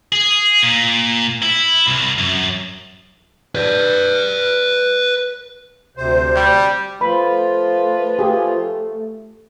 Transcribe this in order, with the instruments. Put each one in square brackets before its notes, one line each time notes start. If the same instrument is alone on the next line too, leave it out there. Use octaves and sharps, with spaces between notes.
[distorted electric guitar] G#4
A#2
E4
C2
F#2
B4 D5
[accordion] D2 C3 C5
[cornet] G3 [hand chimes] G6
[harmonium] F3 F4 [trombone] A3 [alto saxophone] B4 [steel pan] B5
[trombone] A3 [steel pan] G4 G#4